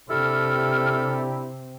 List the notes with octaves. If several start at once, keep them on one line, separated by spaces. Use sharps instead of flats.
C3 D4 E4 G4 A4 F6